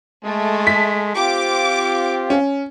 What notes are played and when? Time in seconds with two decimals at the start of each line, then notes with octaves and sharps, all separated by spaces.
0.25 G#3 A3
0.67 B6
1.15 C4 F4 G4 D6
2.30 C#4